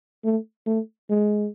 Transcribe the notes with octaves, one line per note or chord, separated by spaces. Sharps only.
A3
A3
G#3